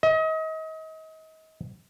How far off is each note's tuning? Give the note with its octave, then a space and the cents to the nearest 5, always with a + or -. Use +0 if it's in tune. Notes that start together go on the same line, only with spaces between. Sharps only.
D#5 +35